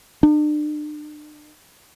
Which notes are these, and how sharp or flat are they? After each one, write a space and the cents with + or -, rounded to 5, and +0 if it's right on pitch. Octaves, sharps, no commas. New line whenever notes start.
D4 +40